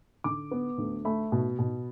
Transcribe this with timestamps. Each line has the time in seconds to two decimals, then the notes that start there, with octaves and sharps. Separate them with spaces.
0.24 D3 D6
0.51 B3
0.78 D2
1.05 A3 B5
1.32 B2
1.59 B2